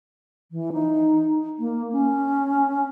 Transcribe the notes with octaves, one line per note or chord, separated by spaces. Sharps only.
E3
D#4
A#3
C#4